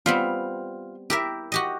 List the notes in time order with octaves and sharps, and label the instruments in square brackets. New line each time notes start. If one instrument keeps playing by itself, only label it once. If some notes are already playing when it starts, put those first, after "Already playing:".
[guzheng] G3 B3 C4 [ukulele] F4
[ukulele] E4 [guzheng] G4 A#4 E5
[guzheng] F#4 G4 D#5